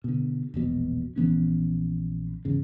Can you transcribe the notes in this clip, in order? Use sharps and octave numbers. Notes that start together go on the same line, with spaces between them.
B2 D3
E1 A#1 B2
A#1 E3 B3 C#4
G#1 E2 C#3